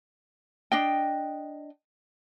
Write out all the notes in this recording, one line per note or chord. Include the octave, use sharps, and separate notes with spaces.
D4 D#5 G5